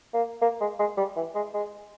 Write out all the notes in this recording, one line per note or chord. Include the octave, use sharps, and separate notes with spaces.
A#3
A#3
G#3
G#3
G3
E3
G#3
G#3